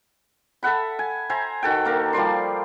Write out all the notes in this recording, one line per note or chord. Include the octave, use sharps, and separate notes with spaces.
A4 E5 F#5 B5
G#5
C5 E5 G#5 A#5
D#3 F#4 A4 G5
A#3 A4 A#4
F3 G3 D5 C6